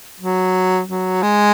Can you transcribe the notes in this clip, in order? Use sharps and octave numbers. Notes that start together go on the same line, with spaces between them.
F#3
F#3
G#3